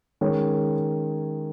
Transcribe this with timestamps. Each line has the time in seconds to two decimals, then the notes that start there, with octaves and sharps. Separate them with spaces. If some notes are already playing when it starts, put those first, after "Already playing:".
0.21 D#3 G#3 C#4 G#4 C#5